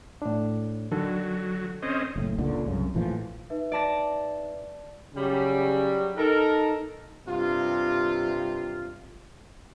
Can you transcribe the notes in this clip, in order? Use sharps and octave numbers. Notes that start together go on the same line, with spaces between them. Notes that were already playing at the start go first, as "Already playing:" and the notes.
A2 D4
D3 D#3 F#3 A4
C4 C#4 D#5
F#1 A2
C#2 A#2 D3
C2 F#2 C#3
A#1 A2 E3 F3
D#4 B4 E5
D5 A5 A#6
C#3 F#3 G3
D#4 A4 A#4
G2 C3 F4